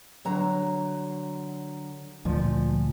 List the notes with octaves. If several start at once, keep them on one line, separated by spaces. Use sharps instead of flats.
D3 F#3 A#5
D2 A#2 F3